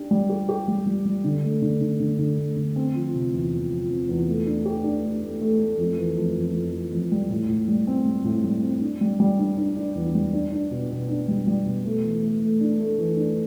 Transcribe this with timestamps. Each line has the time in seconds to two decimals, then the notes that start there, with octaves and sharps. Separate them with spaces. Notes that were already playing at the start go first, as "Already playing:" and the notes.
Already playing: D4 G4
0.11 G3
0.29 G4
0.49 G4
0.68 G3
0.87 G3
1.05 G3
1.24 D3
1.43 A3
1.62 D3
1.81 D3
2.00 D3
2.19 D3
2.38 A3
2.57 D3
2.76 C4
2.95 F3
3.14 C3
3.33 E2
3.52 F3
3.71 F3
3.90 C4
4.09 E2
4.27 A3
4.46 D4
4.65 G4
4.84 D4
5.03 A3
5.22 A3
5.41 A3
5.60 A3
5.78 F2
5.97 E3
6.17 F2
6.36 F2
6.55 F2
6.73 E3
6.92 F2
7.12 G3
7.30 A2
7.49 A2
7.68 G3
7.87 C4
8.06 G3
8.25 A2
8.44 G3
8.62 C4
8.81 D4
9.01 G3
9.20 G3
9.39 D4
9.58 D4
9.76 D4
9.95 E2
10.15 G3
10.33 D4
10.52 D4
10.71 B2
10.90 B2
11.09 D4
11.28 G3
11.47 G3
11.66 B2
11.85 A3
12.04 E3
12.23 A3
12.42 A3
12.61 D4
12.80 A3
12.99 E3
13.17 D4